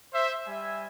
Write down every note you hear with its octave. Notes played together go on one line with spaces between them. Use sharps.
C5 E5
G3 E5 G#5